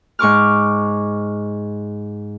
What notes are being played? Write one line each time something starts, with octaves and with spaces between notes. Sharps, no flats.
G#2 C#6 D6 F6